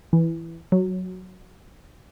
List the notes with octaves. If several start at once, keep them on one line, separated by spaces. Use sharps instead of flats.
E3
F#3